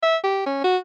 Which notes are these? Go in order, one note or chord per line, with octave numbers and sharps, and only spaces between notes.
E5
G4
C#4
F#4